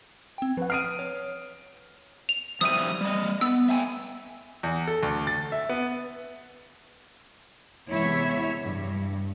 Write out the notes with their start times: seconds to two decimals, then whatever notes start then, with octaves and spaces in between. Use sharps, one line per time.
0.38 C4 G5
0.57 F3 B4 F#5
0.70 D#6 F6 C7 D7 D#7
0.99 C#5
2.29 F7
2.61 F3 G3 E5 D#6 D#7
3.01 G3 D#5
3.41 B3 E6
3.69 E5 G5 G#5
4.63 E2
4.87 A4
5.03 D2
5.27 A6
5.52 E5
5.69 B3
7.90 E2 C3 G#3 E4 C#5 E5
8.65 G2